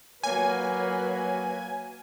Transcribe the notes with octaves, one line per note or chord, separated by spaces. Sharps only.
F#3 A#3 B4 C#5 G#5